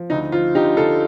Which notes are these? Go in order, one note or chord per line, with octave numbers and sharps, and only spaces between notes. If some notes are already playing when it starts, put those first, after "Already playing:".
Already playing: F3
D2 D#4
F3 F4
D3 D#4 G4
D3 F4 A4